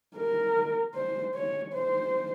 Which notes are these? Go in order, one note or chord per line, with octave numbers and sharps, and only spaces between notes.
A#4
C5
C#5
C5